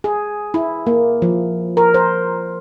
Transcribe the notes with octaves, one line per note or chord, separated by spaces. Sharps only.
G#4
E4
A#3
F3
A#4
C5